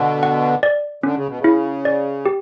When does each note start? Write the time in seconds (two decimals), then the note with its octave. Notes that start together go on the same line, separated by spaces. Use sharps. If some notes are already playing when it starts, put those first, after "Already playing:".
Already playing: B2 D3
0.23 F#5
0.63 D5
1.03 D3 C#4
1.16 C#3
1.27 B2
1.39 C#3
1.44 E4
1.85 D5
2.26 G4